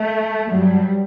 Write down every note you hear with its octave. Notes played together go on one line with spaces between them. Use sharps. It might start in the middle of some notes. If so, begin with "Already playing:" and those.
Already playing: A3
G2 F#3 G3